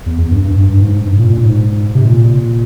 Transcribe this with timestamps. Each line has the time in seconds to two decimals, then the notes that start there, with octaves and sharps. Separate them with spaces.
0.06 E2
0.18 E2
0.31 G2
0.43 G2
0.56 G2
0.69 G2
0.80 G#2
1.05 G2
1.18 A#2
1.30 A#2
1.43 G#2
1.94 C3
2.05 A#2